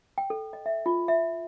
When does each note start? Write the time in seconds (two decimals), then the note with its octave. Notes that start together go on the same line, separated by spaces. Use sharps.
0.18 G5
0.30 A4
0.53 D#5
0.66 E5
0.86 F4
1.08 E5